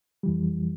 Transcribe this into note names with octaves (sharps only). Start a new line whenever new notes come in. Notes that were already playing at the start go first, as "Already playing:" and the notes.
F2 E3 G3